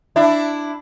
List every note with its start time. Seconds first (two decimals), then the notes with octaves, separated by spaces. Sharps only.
0.16 D4 E4